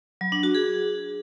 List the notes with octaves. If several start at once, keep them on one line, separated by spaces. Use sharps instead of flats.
F#3
D4
F#4
G#4